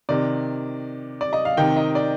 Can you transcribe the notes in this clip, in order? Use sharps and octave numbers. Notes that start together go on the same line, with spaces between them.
C3 D#3 D5
D5
D#5
F5
C3 D#3 G5
D#5
D5